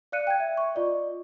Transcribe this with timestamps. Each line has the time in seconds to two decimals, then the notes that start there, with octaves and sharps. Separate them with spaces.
0.12 D5 F5 F#6 C#7 D#7
0.27 G5 G#6
0.40 E5
0.57 C#6
0.75 F4 D5 D#5